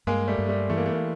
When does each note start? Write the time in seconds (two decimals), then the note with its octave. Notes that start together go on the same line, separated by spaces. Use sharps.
0.07 G2 G#3 A#3
0.28 G3 A3
0.38 G2
0.49 G3 A3
0.70 E3 A3
0.77 A#3
0.86 A3
0.94 A#3